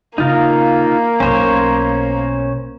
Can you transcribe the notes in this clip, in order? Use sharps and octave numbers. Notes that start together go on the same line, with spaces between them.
C#3 A#3 D#4 F4 A#4
B1 B2 C#4 C5 C#5